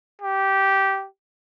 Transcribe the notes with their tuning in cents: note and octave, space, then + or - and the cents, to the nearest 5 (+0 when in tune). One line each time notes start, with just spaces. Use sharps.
G4 -15